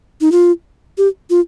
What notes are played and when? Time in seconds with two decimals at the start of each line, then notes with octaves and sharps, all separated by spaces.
0.21 D#4
0.32 F4
0.98 G4
1.30 F4